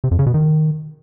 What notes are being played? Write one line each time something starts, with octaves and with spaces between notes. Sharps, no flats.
C3
F2
C#3
B2
D#3